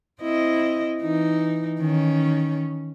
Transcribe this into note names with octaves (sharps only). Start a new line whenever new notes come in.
C4 E4 D#5
E3 D#4
D#3 C#4